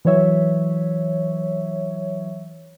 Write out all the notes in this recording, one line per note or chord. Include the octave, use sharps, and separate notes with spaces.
E3 F#3 C#5 E5